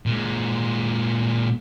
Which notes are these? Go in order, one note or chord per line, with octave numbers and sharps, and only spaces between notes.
A#2 G#3